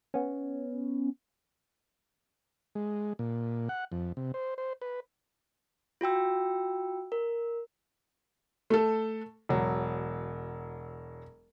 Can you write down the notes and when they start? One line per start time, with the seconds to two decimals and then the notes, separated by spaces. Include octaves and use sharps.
0.14 B3 C#4
2.75 G#3
3.19 A#2
3.69 F#5
3.92 F2
4.17 C3
4.34 C5
4.58 C5
4.82 B4
6.01 F4 F#4 G5 E6
7.12 A#4
8.70 A3 A4
9.49 E1 F#3